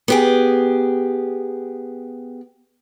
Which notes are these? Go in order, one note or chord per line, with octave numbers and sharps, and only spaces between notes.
B3 G4 G#4